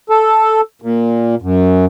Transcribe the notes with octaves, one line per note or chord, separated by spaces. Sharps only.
A4
A#2
F#2